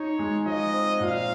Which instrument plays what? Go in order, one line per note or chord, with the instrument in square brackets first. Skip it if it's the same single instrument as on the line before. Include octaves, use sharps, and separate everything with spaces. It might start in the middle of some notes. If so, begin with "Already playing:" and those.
Already playing: [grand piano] D#4 [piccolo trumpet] C#5
[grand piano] G#3
[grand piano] F3 [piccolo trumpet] D#5
[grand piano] C4
[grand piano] A#2 [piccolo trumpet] F5